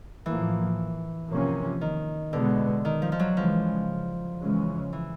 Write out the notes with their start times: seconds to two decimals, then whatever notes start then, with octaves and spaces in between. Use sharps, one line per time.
0.25 A2 E3 F3 A#3
1.30 C3 F3 A#3 C#4
1.81 D#3
2.33 B2 D3 G#3 B3
2.85 D#3
3.02 F3
3.12 F3
3.19 F#3
3.37 C#3 E3 F3 G#3
4.40 C#3 E3 G#3 C#4
4.93 E3